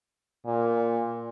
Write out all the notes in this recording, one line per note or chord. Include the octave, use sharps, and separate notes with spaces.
A#2